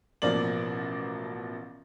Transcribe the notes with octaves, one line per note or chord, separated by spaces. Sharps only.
A1 B2 F3 A#3 D5 F#7